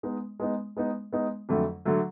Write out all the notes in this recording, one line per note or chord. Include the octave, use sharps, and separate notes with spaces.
G#3 B3 D#4
G#3 B3 D#4
G#3 B3 D#4
G#3 B3 D#4
F2 D3 F#3 A3
D3 F#3 A3